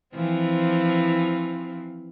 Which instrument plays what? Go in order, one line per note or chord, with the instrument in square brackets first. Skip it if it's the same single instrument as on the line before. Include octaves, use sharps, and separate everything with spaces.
[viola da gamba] E3 F3 C4